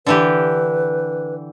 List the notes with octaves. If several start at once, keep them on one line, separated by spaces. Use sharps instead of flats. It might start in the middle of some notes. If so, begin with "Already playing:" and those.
D3 E3 G4 B4